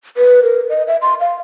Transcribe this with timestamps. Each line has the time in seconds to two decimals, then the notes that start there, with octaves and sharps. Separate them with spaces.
0.17 B4
0.43 A#4
0.70 D#5
0.88 E5
1.02 C6
1.20 F5